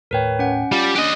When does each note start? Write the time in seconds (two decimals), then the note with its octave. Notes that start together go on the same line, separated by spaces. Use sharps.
0.11 D#2 A2 A#4 B4 C#5 G5
0.39 C#4 F#5
0.72 G3 F4
0.96 D4 G4 D#5 F#6